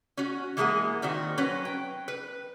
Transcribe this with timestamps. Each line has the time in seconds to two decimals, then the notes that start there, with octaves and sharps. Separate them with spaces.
0.17 C#4 F#4
0.57 E3 G#3 A#3 F4 G#4 F#5
1.02 A#2 D#3 C4 F#4
1.38 F#3 C#4 B4
1.65 G5
2.08 B4